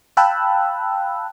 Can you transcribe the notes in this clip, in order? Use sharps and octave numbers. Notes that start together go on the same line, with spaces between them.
F5 G5 A5 B5 E6 F#6